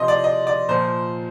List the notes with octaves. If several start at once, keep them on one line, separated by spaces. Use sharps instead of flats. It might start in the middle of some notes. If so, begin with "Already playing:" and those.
Already playing: C3 F3 D#5 C6
D5
D#5
D5
A#2 F3 C5